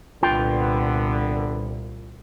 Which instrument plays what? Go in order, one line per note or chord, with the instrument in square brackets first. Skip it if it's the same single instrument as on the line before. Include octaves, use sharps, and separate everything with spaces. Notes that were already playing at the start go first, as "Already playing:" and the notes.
[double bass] C2 A#2 [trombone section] D3 B3 [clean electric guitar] F4 G5